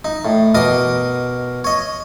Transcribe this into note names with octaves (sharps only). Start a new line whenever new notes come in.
D#4
A2
B2 A#4 D#5 D6 D#6
C#5 D#5